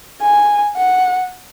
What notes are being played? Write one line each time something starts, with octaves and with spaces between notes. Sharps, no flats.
G#5
F#5